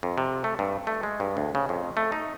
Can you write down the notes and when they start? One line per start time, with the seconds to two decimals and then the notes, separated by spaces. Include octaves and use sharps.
0.03 F2
0.18 C3
0.44 A3
0.59 G2
0.87 A3
1.03 G#3
1.20 G2
1.37 D2
1.55 C#3
1.69 F2
1.97 A3
2.12 D#4